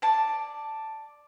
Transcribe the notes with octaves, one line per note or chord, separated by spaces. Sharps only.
D5 A5